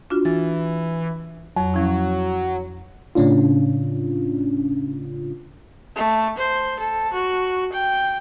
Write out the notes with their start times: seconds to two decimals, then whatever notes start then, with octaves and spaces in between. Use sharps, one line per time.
0.10 D4 F4 F#4
0.25 E3 A6
1.57 F2 F#3
1.74 F3 C#4 E4
3.15 A2 C#3 C#4 D4 F4
5.95 A3
6.38 C5
6.79 A4
7.13 F#4
7.72 G5